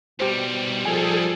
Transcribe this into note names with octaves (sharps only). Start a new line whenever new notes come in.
G#2 B2 G3 G4 C5
F3 G#4 A4 G#5